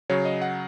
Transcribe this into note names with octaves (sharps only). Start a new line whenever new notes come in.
C#3 F#3 C#5
D#5
F#5